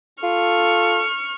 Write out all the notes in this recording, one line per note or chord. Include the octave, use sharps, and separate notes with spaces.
F4 A4 C#6 F6